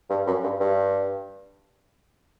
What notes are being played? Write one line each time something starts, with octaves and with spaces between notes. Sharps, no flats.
G2
F#2
G2
G2